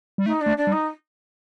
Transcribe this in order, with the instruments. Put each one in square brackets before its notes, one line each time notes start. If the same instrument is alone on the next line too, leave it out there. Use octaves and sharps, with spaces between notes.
[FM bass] G3
[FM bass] A3 [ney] D#4
[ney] D4
[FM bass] A3
[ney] D4
[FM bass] G3
[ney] D#4